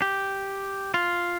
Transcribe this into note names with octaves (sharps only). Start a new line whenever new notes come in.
G4
F4